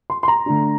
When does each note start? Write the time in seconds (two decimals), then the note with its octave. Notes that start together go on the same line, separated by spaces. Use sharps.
0.10 C6
0.23 C6
0.28 A#5
0.46 D3 A3 D4